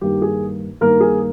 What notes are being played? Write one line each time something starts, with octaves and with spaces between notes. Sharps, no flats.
G2 D#3 A#3 G4
G#4
G2 D#3 A#3 A#4
G#4